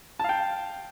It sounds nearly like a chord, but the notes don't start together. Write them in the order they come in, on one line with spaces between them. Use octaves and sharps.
A5 F5 G5